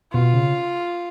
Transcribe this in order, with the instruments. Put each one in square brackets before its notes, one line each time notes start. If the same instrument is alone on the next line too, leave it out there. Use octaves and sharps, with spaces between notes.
[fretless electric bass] B2 [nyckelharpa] F4
[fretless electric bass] C#3